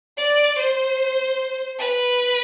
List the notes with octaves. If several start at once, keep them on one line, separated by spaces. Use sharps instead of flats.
D5
C5
B4